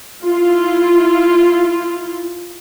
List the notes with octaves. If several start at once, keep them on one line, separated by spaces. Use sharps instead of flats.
E4 F4